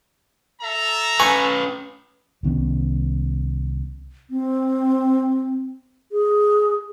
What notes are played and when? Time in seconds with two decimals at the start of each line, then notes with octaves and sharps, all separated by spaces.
0.61 A4 E5 A#5
1.20 C#4 B4 G#5 C#6
2.43 C2 D#3 B3 C#4
4.30 C4
6.12 G#4